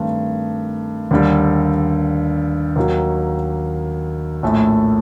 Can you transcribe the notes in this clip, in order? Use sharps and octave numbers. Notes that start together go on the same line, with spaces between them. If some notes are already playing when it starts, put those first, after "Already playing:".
Already playing: G2 D#3 A3 C4
D#2 D3 G3
D#2 D#3 F#3
A#1 A2 A3